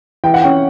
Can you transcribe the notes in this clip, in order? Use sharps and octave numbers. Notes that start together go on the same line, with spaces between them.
E3 G5
F#5
C#4 G5